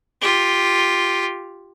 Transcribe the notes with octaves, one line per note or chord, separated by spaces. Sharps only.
F4 G4